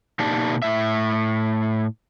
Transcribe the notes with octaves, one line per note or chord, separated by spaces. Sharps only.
B2 A#3 D#4 G4 D5 A5
A2 E5